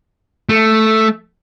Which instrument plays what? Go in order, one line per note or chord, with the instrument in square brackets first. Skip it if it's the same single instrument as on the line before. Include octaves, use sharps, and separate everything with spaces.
[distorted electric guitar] A3